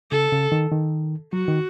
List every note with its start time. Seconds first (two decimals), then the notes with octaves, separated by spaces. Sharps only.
0.11 C#3 A4
0.32 C#3
0.52 D#3
0.72 D#3
1.33 F#3 F#4
1.48 D#3